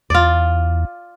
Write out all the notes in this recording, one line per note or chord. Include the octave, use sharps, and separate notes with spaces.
E2 F4 D5